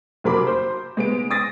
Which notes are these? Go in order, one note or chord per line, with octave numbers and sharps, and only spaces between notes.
F#1 F#3 A#4 B5 D6
C5
G#3 B3 D7
D#6 A6 A#6